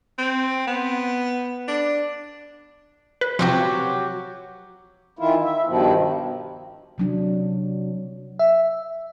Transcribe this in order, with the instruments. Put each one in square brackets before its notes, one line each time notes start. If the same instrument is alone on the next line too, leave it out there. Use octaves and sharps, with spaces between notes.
[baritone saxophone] C4
B3
D4
[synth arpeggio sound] B4
[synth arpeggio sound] C3 F3 [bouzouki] F#3 F#4 G4
[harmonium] D#3 E3 E4 F4
E5
G2 B2 D#3 F3
[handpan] C3 F#3 D4
[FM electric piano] E5